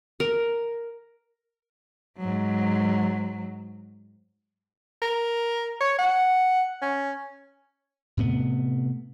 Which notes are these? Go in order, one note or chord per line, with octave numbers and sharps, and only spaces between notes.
A#4
G#2 F#3
A#4
C#5
F#5
C#4
A2 C3 B3